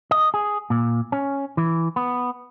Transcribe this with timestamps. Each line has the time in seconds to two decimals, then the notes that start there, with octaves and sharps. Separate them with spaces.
0.11 D#5
0.34 G#4
0.70 A#2
1.12 C#4
1.57 E3
1.96 B3